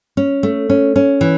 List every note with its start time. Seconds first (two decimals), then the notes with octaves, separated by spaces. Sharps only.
0.17 C#4
0.43 A3
0.70 C#4
0.96 C#4
1.21 E3